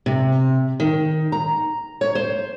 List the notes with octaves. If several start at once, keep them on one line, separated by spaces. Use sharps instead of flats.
C3
D#3
A#5
C#5
C5